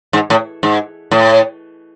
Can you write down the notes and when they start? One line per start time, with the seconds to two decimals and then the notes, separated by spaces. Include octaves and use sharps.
0.13 G#2
0.30 A2
0.63 G#2
1.11 A2